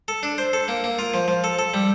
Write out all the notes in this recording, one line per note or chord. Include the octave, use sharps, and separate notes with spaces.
A4
D4
C5
A4
A#3
A#3
F4
F3
F3
A4
A4
G3